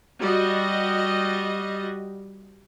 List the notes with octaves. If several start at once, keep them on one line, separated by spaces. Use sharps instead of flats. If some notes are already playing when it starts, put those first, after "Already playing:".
G3 F#4 D#5